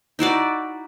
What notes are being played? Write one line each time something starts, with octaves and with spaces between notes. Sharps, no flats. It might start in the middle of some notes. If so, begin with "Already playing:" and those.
D#4 E4 F#4 D5